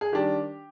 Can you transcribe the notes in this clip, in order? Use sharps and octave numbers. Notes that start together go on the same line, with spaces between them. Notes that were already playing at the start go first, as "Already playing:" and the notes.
G#4
D#3 G3 D4 G4